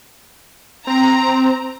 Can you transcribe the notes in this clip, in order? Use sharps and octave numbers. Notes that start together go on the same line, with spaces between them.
C4 A#5